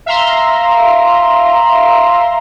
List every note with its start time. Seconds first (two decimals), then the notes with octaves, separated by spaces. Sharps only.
0.06 E5 F5 A#5 C6